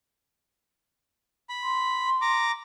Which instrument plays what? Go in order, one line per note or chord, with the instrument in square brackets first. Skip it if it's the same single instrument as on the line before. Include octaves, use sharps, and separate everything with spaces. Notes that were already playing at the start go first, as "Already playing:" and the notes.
[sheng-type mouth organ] B5
[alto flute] C6
[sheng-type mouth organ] A#5 D6